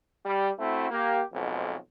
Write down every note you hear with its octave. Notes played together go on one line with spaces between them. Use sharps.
G3
A3 C4 E4 F#4
A#3 G4
B1 F2 G#2 B2